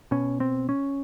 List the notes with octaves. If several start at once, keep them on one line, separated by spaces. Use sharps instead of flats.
B2 C#4
C4
C#4